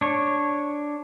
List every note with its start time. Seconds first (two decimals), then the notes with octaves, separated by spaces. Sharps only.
0.01 D4 C#5